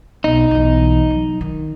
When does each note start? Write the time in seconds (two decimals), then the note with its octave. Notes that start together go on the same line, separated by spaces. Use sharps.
0.24 B1 D#4
0.51 B1 E3
1.10 F#3
1.41 D#3